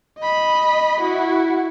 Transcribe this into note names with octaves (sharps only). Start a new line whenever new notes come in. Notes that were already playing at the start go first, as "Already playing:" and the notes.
D#5 B5
E4 F#4